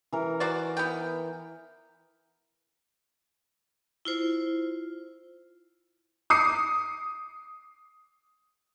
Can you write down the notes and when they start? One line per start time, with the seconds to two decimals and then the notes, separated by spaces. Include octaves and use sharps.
0.12 E3 A#4
0.40 F#4 C5 D5
0.77 B3 G5
4.05 E4 F4 C5
6.30 D6 D#6 C7 C#7